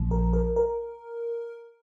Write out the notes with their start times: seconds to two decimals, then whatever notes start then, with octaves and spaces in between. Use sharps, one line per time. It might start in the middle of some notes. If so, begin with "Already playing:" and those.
Already playing: A#1 A#2 F3
0.11 A#4
0.33 A#4
0.56 A#4